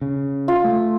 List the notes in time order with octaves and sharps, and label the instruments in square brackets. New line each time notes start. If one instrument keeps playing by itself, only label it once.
[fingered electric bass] C#3
[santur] F4
[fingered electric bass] A3